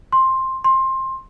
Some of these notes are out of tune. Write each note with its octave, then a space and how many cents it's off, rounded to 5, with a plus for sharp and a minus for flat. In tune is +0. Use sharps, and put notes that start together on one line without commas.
C6 +10
C6 +20